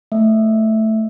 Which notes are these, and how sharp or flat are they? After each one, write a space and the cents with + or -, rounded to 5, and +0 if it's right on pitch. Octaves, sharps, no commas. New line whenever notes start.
A3 +0 E5 +0